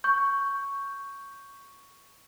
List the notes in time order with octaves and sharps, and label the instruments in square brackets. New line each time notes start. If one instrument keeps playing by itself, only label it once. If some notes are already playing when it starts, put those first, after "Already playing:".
[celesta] C#6 G6